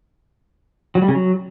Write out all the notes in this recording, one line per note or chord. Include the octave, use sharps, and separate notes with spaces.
F#3
G3
C#3
F#3